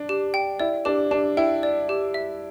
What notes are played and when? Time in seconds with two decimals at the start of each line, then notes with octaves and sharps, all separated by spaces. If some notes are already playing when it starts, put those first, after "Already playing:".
Already playing: D4
0.09 G4
0.34 G5
0.60 E4 D5
0.85 D4 G4
1.11 D4 G4
1.37 E4 G5
1.63 D5
1.89 G4
2.14 E5